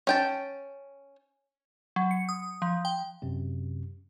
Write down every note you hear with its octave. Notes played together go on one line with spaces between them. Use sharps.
C#4 G5 A5
F#3
C#7
D#6
F3
G5
F#2 C3